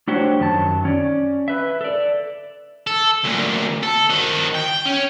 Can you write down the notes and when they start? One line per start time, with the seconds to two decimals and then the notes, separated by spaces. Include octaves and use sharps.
0.08 A3 D4 F#4 G4 C5 C#5
0.39 F#2 D#3 F#3 G4 A5
0.85 C#4 D5
1.48 B4 E5
1.81 A4 D5
2.87 A4
3.24 D2 A#2
3.83 A4
4.09 D#3 F#4
4.55 G5
4.86 C#4